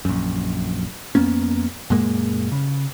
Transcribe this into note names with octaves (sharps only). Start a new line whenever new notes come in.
A#1 F#2
F2 A#3 B3 C#4
F#2 A#2 G#3 A#3
C#3